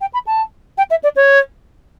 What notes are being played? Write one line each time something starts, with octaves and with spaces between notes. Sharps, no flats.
G5
B5
A5
G5
E5
D5
C#5